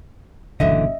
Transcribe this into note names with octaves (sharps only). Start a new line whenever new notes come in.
F#1 A#2 D3 E3 D#5 E5